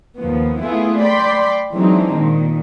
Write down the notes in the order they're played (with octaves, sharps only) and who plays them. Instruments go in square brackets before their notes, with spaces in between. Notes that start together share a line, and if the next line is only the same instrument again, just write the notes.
[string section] D#2 F3 B3
A3 B3 E4 F4 G#4
D5 G5 B5 C6
E3 F#3 G#3 C4 D4 D#4
A#2 D#3